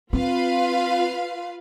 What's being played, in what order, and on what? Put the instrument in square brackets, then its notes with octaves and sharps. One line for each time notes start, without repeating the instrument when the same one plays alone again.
[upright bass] C4 [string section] F4 B4 F5